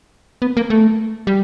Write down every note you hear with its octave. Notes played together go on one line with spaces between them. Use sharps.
B3
A#3
A3
G3